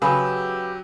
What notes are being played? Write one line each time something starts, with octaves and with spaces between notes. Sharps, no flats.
C#3 F#3 G4 G#4 B4 E6